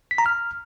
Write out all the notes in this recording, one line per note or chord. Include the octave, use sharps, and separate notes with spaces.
B6
A#5
F6